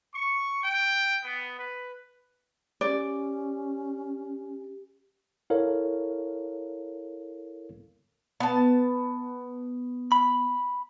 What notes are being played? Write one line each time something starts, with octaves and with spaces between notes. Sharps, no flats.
C#6
G5
B3
B4
C#4 G4 D5
E4 A4 A#4 C#5 F5
B3 A5
B5